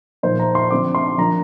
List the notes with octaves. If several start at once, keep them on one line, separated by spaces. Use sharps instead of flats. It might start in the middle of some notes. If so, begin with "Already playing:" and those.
A#2 F3 A#3 D#4 C5
A#5
C6
D3 F3 C4 D6
C6
F3 A#3 D4 A#5